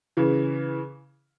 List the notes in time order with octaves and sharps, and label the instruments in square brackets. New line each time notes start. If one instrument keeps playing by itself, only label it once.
[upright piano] C#3 E3